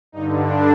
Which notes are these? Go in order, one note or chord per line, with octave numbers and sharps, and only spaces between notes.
G2 D3 D#4
D4